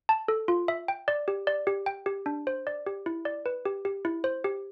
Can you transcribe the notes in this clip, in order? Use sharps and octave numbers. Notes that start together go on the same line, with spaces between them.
A5
A4
F4
E5
G5
D5
G4
D5
G4
G5
G4
D4
C5
D5
G4
E4
D5
B4
G4
G4
E4
C5
G4